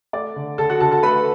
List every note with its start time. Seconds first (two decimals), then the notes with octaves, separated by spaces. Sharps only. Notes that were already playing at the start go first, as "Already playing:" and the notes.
0.13 A3 D5 D6
0.36 D3
0.58 D3 A4 A5
0.70 F#4 F#5
0.80 D3 A4 A5
0.91 A4 A5
1.03 A3 B4 B5